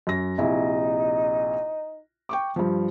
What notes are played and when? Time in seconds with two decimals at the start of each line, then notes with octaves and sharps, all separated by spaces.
0.07 F#2 A#6
0.38 A#1 C3 D#4 E4
2.29 G5 C#6 D6
2.56 G2 F3